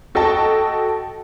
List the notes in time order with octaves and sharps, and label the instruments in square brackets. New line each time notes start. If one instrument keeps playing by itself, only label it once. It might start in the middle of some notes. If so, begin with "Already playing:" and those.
[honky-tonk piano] F#4 A4 D#5 G5 A5